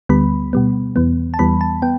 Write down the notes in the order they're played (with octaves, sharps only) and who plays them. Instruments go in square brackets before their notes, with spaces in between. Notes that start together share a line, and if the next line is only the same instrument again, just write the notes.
[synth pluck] D2 D3 G3 B3 B5
B2 G3 B3
E2 E3 B3
A5
E2 E3 G3 B3 B5
A5
B3 G5